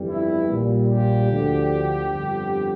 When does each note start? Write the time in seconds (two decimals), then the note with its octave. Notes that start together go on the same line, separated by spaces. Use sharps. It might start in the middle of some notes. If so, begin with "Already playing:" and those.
Already playing: G1 F2 E3 G3
0.09 E4
0.49 A#1 A#2 G3
0.88 G4
1.29 D2 D3 F3
2.07 G1 F2 D3 G3